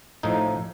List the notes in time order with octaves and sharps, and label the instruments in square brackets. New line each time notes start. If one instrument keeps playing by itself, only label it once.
[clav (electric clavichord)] A2 F3 D#4